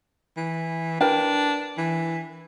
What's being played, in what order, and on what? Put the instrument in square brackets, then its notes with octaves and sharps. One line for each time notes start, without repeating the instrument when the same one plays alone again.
[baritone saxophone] E3
[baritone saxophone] D4 [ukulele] A#4 B4 G5
[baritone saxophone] E3